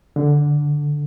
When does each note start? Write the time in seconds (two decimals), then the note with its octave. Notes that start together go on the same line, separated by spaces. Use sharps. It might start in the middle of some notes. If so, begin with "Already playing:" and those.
0.16 D3